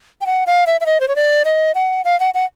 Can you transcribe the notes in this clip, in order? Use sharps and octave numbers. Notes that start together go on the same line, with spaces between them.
G5
F#5
F5
E5
E5
D#5
C5
C#5
D5
D#5
F#5
F5
F#5
F#5